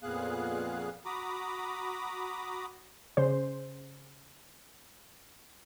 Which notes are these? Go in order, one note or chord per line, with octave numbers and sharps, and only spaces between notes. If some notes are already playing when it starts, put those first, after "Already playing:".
F2 A#2 B3 G#4 F5 F#6
F#4 A#5 B5 D6 D#6
C#3 C5